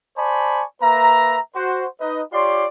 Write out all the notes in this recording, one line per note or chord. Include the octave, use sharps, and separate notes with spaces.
C5 D5 G#5 A5 B5 C#6
A#3 B4 E5 A#5
F#4 C5
D#4 B4 D#5
F4 G4 C#5 D5 C6